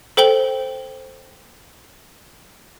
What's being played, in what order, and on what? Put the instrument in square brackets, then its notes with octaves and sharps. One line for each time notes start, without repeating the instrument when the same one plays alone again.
[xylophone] A4 C5 G5 F#7 G7